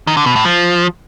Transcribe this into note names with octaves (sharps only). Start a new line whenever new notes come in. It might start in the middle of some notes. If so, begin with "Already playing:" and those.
D#3
D3
B2
A2
F3